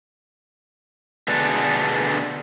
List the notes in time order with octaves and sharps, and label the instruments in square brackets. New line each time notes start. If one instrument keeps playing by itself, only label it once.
[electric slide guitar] B2 D3 B3 D4 G#4 A4